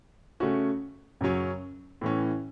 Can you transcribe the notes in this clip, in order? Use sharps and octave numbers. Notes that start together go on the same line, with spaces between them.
C#3 A3 C#4 F#4
F#2 C#3 F#3 C#4
A2 E3 C#4